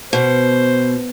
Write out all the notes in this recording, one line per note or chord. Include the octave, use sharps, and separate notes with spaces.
B2 C5